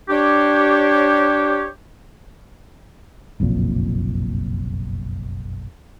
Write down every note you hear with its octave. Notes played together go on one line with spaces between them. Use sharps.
D4 G4 C#5
F#1 B1 F2 A#2